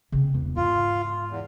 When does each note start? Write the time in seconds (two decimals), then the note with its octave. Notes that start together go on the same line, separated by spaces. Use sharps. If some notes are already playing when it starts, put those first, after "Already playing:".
0.12 C#3 C4
0.34 E2 D4
0.56 G#2 F4
1.31 E2